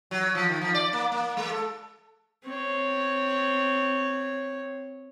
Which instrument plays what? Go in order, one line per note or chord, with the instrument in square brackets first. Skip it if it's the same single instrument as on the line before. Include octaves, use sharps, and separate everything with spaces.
[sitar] F#3
F3
D#3
F3
D5
A#3
A#3
G#3
A4
[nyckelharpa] C4 C#5